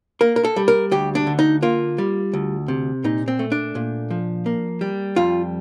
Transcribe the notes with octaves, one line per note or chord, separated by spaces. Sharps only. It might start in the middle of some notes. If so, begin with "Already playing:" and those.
A#3 A#4
A#4
A4
G3
A#4
D2 G4
D4
D3
D#4
A#3 F4
G3
D2
C3
A#2 D#4
C4
A3
D4
A#2
F3
A#3
G3
F2 F4